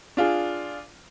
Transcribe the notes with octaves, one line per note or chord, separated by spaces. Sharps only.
D4 F4 G#4